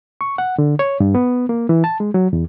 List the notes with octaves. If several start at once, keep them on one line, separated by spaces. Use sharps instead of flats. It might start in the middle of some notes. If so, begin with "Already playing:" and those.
C#6
F#5
D3
C#5
G2
B3
A#3
E3
A5
G#3
F#3
E2